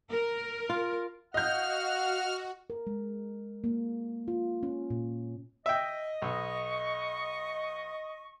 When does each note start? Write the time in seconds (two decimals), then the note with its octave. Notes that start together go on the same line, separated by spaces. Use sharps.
0.10 A#4
0.70 F4
1.34 F#4 D#5 F5 F#5 F6 G6
2.70 A#4
2.87 G#3
3.64 A#3
4.28 F4
4.63 C#4
4.90 A#2
5.66 D#5 E5 G5
6.22 B1 C#6